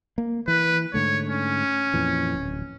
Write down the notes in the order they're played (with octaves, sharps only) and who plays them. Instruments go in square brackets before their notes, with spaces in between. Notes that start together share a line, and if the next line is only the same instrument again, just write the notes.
[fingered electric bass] A#3
[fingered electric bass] E3 [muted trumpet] B4
[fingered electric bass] G#2 D3 A3 [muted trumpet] C#5
[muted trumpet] C#4
[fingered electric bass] F2 A#2 E3
D1